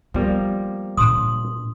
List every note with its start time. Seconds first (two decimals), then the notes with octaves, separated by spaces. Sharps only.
0.14 F3 G3 A#3 B3
0.97 A#2 D4 C6 D#6